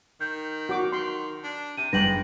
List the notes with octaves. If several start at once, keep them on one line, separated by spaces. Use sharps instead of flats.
D#3 G6
F#4 D6
D#3 C6
D4
C3 D#7
F#1 G#2 G3 D4 B4 G5 A#6 F#7